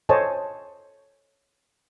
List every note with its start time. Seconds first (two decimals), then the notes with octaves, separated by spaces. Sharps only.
0.09 A4 C5 C#5 D#5 G#5 A5